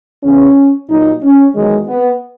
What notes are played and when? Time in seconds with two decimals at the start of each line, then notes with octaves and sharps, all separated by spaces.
0.24 E2 C#3 E3 C#4
0.89 A#2 F#3 D#4
1.23 C#4
1.55 E2 D#3 F#3 G#3
1.87 B3